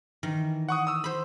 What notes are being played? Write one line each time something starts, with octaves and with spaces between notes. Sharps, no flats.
D#3 E3
F#5 C#6 D#6
D#6 E6
C5 B5